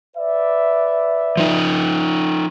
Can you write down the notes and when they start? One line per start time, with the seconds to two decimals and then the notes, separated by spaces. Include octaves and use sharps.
0.17 B4 D5 E5
1.37 F3 D#4